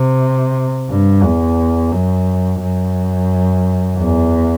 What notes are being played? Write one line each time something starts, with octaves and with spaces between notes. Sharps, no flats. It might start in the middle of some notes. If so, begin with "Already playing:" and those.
Already playing: C3
G2
E2
F#2
F#2
E2